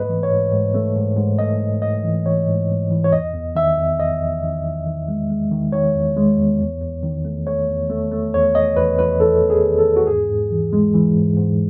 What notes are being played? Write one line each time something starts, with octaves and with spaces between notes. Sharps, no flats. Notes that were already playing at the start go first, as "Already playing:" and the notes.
Already playing: G#2 A3 B4 D#5
E3
C#5
G#2
G#2
A3
G#2
G#2
A3 D#5
G#2
G#2 D#5
E3
E3 C#5
G#2
G#2
E3
C#5
E2 D#5
E2
D#3 E5
E2
E2 D#5
E2
D#3
D#3
D#3
G#3
G#3
D#3
D#3 C#5
E2
G#3
E2
E2
E2
D#3
A3
A3 C#5
E2
A3
A3
E2 C#5
E2 D#5
E2 B4
E2 B4
E2 A4
E2
G#4
D#3
A4
E2
F#4
G#2 G#4
G#2
E3
G#3
E3
G#2
G#2